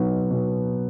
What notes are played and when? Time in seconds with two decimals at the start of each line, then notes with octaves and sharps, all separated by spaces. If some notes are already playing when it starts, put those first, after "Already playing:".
Already playing: B2 F#3 B3 D#4
0.31 B2